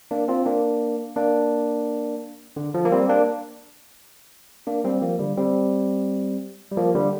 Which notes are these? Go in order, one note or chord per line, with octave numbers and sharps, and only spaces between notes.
A#3 D4
C4 F4
A#3 D4
A#3 D4
D3
F3
A#3
G3 C4
A#3 D4
A#3 D4
G3 C4
F3 A#3
D3 G3
G3 C4
G3
F3 A#3
D3 G3